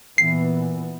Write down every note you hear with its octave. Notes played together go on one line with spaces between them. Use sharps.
A#2 E3 B3 C7